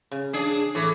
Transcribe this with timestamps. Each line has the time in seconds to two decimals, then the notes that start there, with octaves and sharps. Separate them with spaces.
0.11 C#3
0.33 D4 G#4
0.75 A2 E3 A4